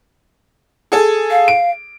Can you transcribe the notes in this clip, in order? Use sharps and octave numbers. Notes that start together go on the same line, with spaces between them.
G#4 A4
F5
D7